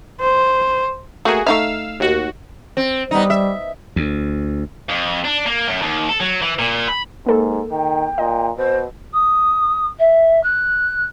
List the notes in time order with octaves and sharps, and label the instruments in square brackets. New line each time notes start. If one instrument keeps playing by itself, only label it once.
[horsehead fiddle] C5
[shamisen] A3 A#3 [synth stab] F#4 G#4
[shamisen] A3 D#4 E5 [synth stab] F5 E6
[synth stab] D#2 F#4
[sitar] C4
[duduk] G3 [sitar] B3 D#4
[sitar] E5
[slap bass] D2
[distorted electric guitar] F2
D4
A#3
F#2
D#2
A4
F#3
E3
A#2
B5
[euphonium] G#2 [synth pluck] A#3 A4 A#4
[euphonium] D#3 [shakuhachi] G5
[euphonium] A#2 [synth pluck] D#5
[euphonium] B2 [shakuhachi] C5
[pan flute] D#6
E5
F#6